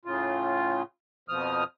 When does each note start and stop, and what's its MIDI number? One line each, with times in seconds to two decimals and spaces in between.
0.05 0.82 45
0.05 0.82 49
0.05 0.82 65
1.29 1.64 41
1.29 1.64 47
1.29 1.64 53
1.29 1.64 87
1.29 1.64 89